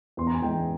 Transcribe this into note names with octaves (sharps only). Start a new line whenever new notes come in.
E2 C6
A#5
G#5
E3 G#3 G5